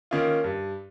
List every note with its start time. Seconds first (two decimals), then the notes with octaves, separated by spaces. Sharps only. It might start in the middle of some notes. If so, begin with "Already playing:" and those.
0.11 D#3 A#3 C#4 F4
0.44 G2